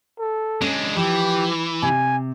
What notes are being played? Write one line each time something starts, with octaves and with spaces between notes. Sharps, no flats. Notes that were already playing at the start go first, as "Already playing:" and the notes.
A4
G#3 C#4 D4
E3 F3 G4
C3 G#5